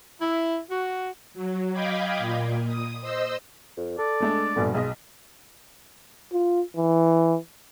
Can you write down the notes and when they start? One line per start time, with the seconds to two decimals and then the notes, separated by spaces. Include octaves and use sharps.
0.21 E4
0.70 F#4
1.34 F#3
1.73 D#5 F5 G5 B5 D6 G#6
2.19 A#2
2.67 D#6
3.01 C5 D#5 E6
3.77 F2
3.98 A4 D5
4.20 G#3 A3 D4
4.56 A#1 G2 B2 D3
4.75 B1 G#3 D#5
6.33 F4
6.76 E3